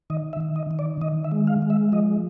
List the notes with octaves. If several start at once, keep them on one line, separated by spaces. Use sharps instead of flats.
D#3 D#5
E5
D#3
D#5
D#3
D5
D#3 D#5
E5
G#3
F5
G#3
E5
F3 D#5